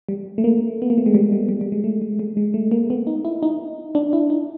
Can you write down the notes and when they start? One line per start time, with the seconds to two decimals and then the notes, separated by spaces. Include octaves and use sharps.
0.09 G3
0.38 A3
0.44 A#3
0.82 B3
0.90 A#3
0.98 A3
1.06 G#3
1.15 G3
1.32 G3
1.49 G3
1.61 G3
1.72 G#3
1.84 A3
2.02 G#3
2.19 G#3
2.37 G#3
2.54 A3
2.71 A#3
2.90 B3
3.07 D#4
3.25 E4
3.43 D#4
3.95 D4
4.13 E4
4.30 D#4